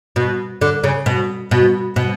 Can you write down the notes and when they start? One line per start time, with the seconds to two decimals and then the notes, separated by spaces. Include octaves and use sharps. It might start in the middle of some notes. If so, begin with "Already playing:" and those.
0.16 B2
0.61 D3
0.84 C#3
1.06 B2
1.51 B2
1.96 B2